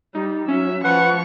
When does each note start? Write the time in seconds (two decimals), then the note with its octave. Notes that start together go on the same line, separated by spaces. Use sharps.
0.15 G3 D#4
0.48 F#3 C#4 E5
0.84 F3 B4 F#5 C#6